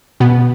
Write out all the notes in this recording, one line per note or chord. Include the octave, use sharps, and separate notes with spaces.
B2 B3